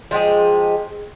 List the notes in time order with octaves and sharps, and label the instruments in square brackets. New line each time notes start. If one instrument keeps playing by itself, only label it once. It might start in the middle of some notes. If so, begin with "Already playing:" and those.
[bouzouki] F3 G#3 G4 G#4